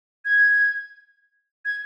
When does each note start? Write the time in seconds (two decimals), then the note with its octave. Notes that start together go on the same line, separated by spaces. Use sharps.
0.25 G#6
1.65 G#6